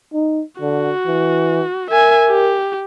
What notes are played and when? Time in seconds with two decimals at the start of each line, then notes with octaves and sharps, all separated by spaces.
0.14 D#4
0.61 D3 F#4
1.06 E3
1.90 A#4 E5 G#5
2.28 G4